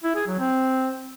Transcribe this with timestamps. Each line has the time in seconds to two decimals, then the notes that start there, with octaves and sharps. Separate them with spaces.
0.04 E4
0.16 G#4
0.27 F#3
0.39 C4